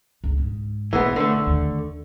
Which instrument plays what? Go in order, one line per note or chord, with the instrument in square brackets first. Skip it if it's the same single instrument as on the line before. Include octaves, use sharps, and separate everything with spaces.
[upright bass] C#2 C3
G#2
[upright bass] B1 [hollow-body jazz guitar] E3 G#3 B3
[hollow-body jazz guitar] D3 A3
[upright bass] D#2